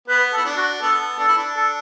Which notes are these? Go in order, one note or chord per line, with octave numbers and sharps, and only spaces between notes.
B3 B4
A4
E4
D4
F#4
B3 A4
D4 A4
E4
D4
A4